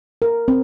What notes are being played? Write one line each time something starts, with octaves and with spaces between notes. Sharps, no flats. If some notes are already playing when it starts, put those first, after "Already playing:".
A#4
C4